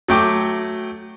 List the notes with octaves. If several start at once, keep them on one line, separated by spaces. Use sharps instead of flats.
F#3 A3 G5 D6